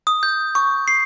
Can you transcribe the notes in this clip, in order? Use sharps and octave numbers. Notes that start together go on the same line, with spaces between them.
D#6
G6
C#6
C7